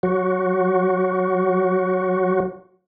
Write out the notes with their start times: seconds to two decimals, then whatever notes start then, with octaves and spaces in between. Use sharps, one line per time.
0.03 F#3 F#4